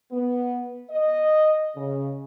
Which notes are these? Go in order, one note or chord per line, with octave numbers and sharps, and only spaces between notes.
B3
D#5
C#3